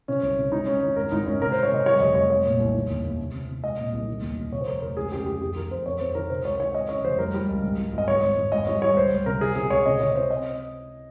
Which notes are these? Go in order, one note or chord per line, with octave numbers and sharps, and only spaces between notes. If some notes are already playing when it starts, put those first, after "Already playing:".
C3 C#4
C2
C3
G#3 D#4
G#3 C#4
D#3 D#4
G#1 A#4
G#1 D#4
G#1 C#4
C3 A#4
C5
G#3
C#5
C3 D#5
G3 C#5
F1 D#5
F1 C#5
G#3 C#5
A#2
C2
D#3
D#2
D#2
C3
C3
C3
G#3 D#5
A#2
C2
D#3
D#2
D#3
C3 C#5
C5
F1 A#4
F1 A#4
C#2 G#4
C#3 G4
C#2 G4
F2 G4
D#3 A#4
F2 C5
F2 C#5
F2 C5
D#3 A#4
C3 C5
C#2 C#5
D#3 C#5
G#3 D#5
C#3 C#5
F1 C5
G3 A#4
G3
C#2
G#1
G3
G#1 D#5
G#2 C#5
G#1
G#1
G#1 D#5
G3 C#5
G3 C#5
C#2 C5
C#2
C3 A#4
C3 G#4
C3 G#4
C#2 C#5
C3 D#5
C3 C#5
C3 C5
D#5